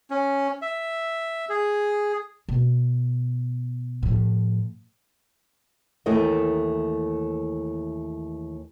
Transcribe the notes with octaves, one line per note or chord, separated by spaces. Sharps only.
C#4
E5
G#4
B2
A2 F3
D#2 E3 A3 E4 A#4 D#5